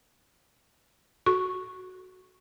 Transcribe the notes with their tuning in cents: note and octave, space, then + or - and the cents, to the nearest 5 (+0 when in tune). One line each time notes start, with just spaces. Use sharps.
F#4 +0 A4 -30 C#6 +0